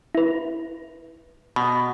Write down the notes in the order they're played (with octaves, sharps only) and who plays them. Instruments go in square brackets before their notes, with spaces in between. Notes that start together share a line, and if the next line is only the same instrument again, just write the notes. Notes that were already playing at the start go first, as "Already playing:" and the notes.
[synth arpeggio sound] E4 B4
[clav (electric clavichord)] B2 [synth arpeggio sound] B5